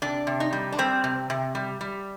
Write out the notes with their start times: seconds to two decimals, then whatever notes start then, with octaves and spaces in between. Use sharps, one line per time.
0.02 C3 D4
0.27 C3
0.40 D#4
0.53 G3
0.72 D4
0.79 G3 C4
1.04 C3
1.30 C3
1.55 G3
1.81 G3